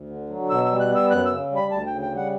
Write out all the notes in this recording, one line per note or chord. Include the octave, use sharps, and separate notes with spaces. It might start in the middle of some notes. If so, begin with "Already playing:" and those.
Already playing: D2
D3
F#3
B2 E6
G3 E6
F#6
B3 E6
F#2 F#6
E6
C#3
G3
B5
D2 A5
C#3 G5
G5
G3 F#5